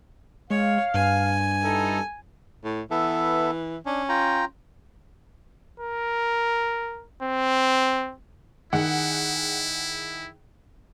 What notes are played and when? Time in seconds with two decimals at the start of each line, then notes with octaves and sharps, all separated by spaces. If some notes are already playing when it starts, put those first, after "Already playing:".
0.50 G#3 C#5 F5
0.94 G2 G#5
1.64 D#4 E4 A4
2.64 A2
2.91 E3 B3 A4 E5
3.86 C#4 D4
4.09 F4 G5 A#5
5.80 A#4
7.23 C4
8.73 D#3 E4 G#4 F#5